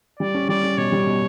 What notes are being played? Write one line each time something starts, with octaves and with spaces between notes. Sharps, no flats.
G3 D5
C#4
G3 D5
C#4
B2 C#5
G3
B2